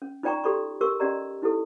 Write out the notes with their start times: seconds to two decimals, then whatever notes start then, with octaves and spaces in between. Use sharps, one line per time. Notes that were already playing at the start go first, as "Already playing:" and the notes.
0.02 C#4
0.23 D#4 F4 D5 G5 A#5 C#6
0.44 F#4 G4 A4 D5 B5 C#6
0.81 F#4 G4 A#4 C#6 E6
1.00 C#4 F#4 G4 D5 D#5 A#5
1.42 D#4 E4 G4 A4